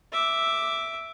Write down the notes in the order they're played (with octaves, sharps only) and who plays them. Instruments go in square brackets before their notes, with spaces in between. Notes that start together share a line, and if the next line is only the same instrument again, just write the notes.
[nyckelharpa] E5 D6